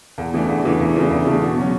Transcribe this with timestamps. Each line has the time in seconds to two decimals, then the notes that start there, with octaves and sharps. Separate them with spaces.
0.18 E2
0.34 C#3 E3 A3 D4
0.49 E2
0.65 C#3 E3 A3 D4
0.80 E2
0.96 C#3 E3 A3 D4
1.11 E2
1.27 C#3 E3 A3 D4
1.42 B2
1.57 F#3 C#4